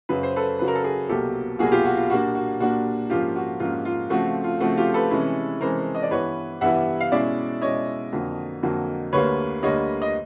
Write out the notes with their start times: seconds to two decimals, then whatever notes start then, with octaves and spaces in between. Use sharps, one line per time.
0.09 F#2 C#3 F#3 B4
0.23 C5
0.36 A4 B4
0.59 F#2 C#3 F#3 B4
0.68 A#4
0.75 A4
0.84 G#4 A#4
1.09 C2 B2 F#3 A#3 G4 A4
1.59 C2 B2 F#3 A#3 F#4 G#4
1.72 F4 G4
1.85 F#4
1.97 F4
2.10 A#2 G3 A#3 D4 F#4
2.35 F#4
2.59 A#2 G3 A#3 D4 F#4
3.10 G#2 F3 A#3 C#4 F4 G4
3.36 F#4
3.60 G#2 F3 A#3 C#4 F4
3.85 F4
4.10 C#3 F3 A3 C4 F#4
4.44 F4
4.60 C#3 F3 A3 C4 F#4
4.77 F4 G4
4.94 A4 B4
5.11 C3 E3 G#3 C#4 E4
5.61 C3 E3 G#3 C#4 E4 A#4 C5
5.95 D#5
6.03 D5
6.11 G2 E3 G3 B3 E4 B4 C#5
6.61 G2 E3 G3 B3 E4 E5 F#5
7.01 F5
7.12 B2 G#3 C#4 E4 D5 E5
7.61 B2 G#3 C#4 E4 C#5 D#5
8.13 F2 D3 F#3 A#3
8.63 F2 D3 F#3 A#3
9.13 D2 D3 G3 A#3 B4 C#5
9.63 D2 D3 G3 A#3 C#5 D#5
10.02 D#5